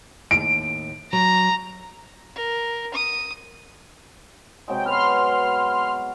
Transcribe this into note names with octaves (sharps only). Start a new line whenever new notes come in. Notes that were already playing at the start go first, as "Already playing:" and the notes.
D#2 A2 D7
F#3 A#5
A#4
D#6
C3 F#3 G#3 G5
B3 F#5 B5 C6 F6